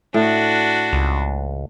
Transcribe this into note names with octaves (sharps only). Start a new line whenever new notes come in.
A2 D4 F#4
C#2